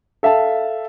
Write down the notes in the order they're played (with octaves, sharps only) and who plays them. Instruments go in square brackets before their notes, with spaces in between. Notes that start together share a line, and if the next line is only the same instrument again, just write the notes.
[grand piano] A4 E5 F5 A5